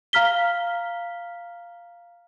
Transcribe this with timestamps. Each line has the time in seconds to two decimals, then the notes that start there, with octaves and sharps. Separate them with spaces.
0.13 F5 A#5 F6 B6 G7